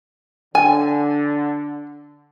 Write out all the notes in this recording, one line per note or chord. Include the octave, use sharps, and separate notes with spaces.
D3 G#5